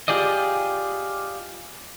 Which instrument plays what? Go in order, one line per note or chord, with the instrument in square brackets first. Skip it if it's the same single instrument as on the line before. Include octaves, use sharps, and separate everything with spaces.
[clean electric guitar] F4 G4 G#4 D5 D#5